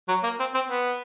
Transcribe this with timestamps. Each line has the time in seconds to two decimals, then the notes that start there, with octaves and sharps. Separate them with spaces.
0.09 F#3
0.24 A#3
0.40 C4
0.55 C4
0.69 B3